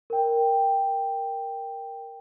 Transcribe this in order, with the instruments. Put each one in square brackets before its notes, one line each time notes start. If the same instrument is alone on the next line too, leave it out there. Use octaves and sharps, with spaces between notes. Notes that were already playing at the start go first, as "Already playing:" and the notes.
[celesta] A#4 G5